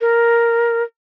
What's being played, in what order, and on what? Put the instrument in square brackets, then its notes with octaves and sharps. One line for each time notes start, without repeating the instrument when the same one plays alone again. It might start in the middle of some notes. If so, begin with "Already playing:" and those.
[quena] A#4